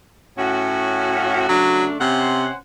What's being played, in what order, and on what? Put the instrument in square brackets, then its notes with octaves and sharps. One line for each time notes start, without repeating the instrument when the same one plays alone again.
[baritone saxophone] A2 [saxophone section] C#4 F#4
[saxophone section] C#3 A3 D4 [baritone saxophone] F#3
[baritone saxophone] C3 [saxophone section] C#4 C5 F#5